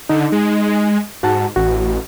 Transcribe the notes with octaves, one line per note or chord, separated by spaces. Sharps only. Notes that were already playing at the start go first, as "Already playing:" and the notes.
D3 D#4
G#3
G#2 F#4 F#5 A5
A1 F#4